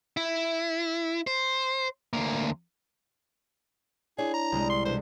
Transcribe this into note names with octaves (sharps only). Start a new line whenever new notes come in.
E4
C5
D2 A#3
D4 E4 G#4 C#5
A#5
C2 G#3
C6
B2 D3 E3 C5